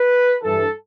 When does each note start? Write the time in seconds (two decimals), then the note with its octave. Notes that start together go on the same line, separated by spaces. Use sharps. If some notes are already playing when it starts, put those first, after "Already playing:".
Already playing: B4
0.43 G2 E3 A4